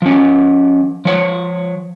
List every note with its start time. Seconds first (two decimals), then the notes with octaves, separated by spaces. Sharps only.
0.02 F3 C#4
1.05 F3 C#5